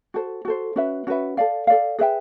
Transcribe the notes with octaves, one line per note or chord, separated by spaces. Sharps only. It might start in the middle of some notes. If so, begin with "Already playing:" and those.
F#4 A4 C5
F#4 A4 C5
C#4 F#4 B4 E5
C#4 F#4 B4 E5
A4 D5 F5
A4 D5 F5
G#4 B4 E5 G5